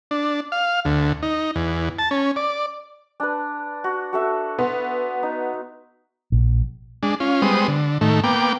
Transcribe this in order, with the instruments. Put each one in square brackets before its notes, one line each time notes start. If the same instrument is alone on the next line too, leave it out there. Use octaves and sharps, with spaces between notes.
[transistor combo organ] D4
F5
D2
D#4
E2
A5
C#4
D5
[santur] D4 B4
F#4
F#4 A4 E5
[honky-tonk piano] B3 [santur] C6
[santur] D#4
[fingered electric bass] A#1
[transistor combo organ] G#3 D4
C#4 F4
G3 G#3 B3 C5 D#6
D3
A2 D#3 A3
A#3 B3 G5 D6